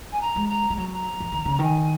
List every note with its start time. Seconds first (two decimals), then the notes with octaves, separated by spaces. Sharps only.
0.12 G#5
0.21 A#5
0.36 G#3
0.49 A#5
0.70 G#3
0.77 F#3 A#5
0.92 A#5
1.20 F3
1.32 D#3
1.45 C#3
1.59 D#3 G#5